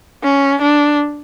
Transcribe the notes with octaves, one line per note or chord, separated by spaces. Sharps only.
C#4
D4